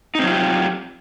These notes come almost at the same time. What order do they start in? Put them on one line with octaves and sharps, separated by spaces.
D#4 C4 F#3 F4 G4